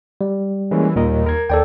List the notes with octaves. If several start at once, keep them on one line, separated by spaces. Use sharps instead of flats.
G3
E3 G#3 A#3 C#4
D#2 A#2 A#4 D#5
A#4 G#6
D#2 A4 D5 G5